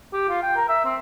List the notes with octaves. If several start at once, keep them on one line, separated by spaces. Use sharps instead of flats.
G4
F4
G5
A#4
E5
C4